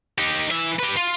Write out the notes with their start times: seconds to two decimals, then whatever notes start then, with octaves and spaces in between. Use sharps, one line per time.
0.18 D#4 G4
0.51 E3 E5
0.79 G4 B4
0.96 F4